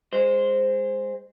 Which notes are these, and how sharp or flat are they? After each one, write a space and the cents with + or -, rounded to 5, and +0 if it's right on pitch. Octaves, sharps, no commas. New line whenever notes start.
G#3 -25 C5 +0